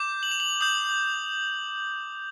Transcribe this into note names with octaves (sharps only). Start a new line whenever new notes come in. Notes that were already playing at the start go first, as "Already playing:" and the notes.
Already playing: D6 G6
F#7
F7
F#7
D#6 G6 F#7